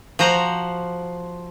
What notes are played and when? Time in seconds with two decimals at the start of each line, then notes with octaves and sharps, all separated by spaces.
0.19 F3 F#4 C5 A#5